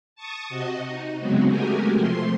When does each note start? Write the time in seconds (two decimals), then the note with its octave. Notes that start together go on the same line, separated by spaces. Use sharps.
0.15 A5 C#6 D#6
0.49 C3 F#4 D#5
0.87 D#4
1.18 C#3 F#3 G#3 B3 C4 F#4
1.48 G#3 A3 F#4 G4 A#4 G#5
1.96 C3 F3 A3 C6